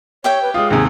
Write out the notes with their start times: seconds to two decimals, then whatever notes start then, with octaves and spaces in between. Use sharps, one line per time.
0.24 G4 C#5 E5 G5
0.42 B4
0.54 G#3 F4 D#6
0.70 D#2 G#2 C3 G#4